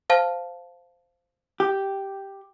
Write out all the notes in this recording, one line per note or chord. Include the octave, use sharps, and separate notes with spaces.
C5 F5 A5
G4